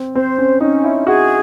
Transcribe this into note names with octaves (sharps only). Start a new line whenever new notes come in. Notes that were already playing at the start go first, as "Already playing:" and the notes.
Already playing: C4
C4 C5
C#4
C#4 D#4
E4
F#4 G#4